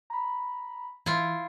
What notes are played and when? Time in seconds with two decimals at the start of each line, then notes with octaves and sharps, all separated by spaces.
0.10 A#5 B5
1.06 E3 E4 F4